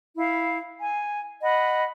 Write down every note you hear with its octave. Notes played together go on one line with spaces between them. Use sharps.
E4 F5
G#5
D#5 F#5 B5